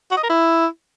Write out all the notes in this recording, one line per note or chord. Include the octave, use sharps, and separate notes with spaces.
F#4
D#5
A#4
E4